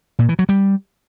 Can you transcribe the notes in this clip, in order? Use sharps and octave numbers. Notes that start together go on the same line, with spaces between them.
A#2
E3
F#3
G3